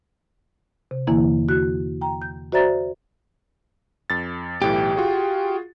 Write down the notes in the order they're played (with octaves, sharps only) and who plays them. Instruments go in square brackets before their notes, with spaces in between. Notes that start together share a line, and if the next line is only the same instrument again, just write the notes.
[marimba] C3
E2 D3 E3 A#3 E4
F#4 F#6
G5 A#5
G6
F#4 C5 D5 E5 A#5 A6
[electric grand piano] F2 A6
[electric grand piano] B1 A2 E3 [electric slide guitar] G4
[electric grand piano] F4 F#4 G#4